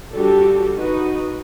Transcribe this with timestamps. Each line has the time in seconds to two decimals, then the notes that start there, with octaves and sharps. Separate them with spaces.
0.13 G3 D4 F#4 G4 A4
0.76 D#4 F#4 B4